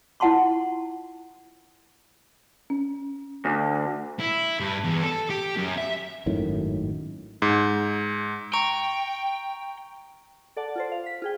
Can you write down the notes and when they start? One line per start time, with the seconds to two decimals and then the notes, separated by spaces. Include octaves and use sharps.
0.20 E4 F4 F#5 A5 C6 C#6
2.70 C#4
3.45 D2
4.20 E4
4.60 G2
4.84 E2
5.03 A4
5.30 G4
5.57 F#2
5.78 E5
6.26 G#1 F#2 A2 D#3
7.42 G#2
8.54 G5 A#5 C#6 D7
10.57 A4 D5 F#5 A5
10.76 F4 A4 C5
10.92 F5
11.06 B6
11.22 F4 G#4 G5